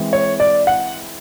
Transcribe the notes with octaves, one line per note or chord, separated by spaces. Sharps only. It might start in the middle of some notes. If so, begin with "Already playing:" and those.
Already playing: E3 G#3 C4
C#5
D5
F#5